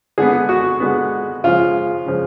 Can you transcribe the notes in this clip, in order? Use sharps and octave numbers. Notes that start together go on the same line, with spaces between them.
D3 G#3 B3 G#4
F#4
D3 G#3 B3
C#3 F3 G#3 F4
C#3 F3 G#3